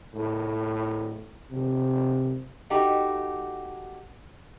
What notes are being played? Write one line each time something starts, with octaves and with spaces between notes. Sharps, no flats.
A2
C3
A3 D#4 F#4 G4